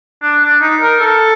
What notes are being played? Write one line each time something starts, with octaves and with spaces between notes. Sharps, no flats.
D4
D4
D#4
A#4
A4